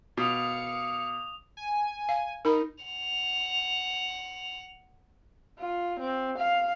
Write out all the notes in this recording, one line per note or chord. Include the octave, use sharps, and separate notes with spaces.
B2 F5 D6 D#6 C#7 F7
G#5
F5
D#4 A#4 B5
F#5 F7
F4
C4
F5